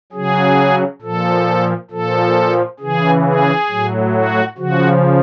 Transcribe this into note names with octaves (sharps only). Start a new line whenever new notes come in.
C#3 F#3 G#4
A#2 F3 A4
A#2 F3 A4
C#3 E3 G#4
G#4
A2 F#3
F#4
C#3 F3 F#4